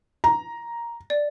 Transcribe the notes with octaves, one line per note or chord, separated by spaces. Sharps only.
A#5
D5